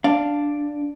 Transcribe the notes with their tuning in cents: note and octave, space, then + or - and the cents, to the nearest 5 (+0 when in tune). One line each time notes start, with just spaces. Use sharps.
D4 +0 F5 +0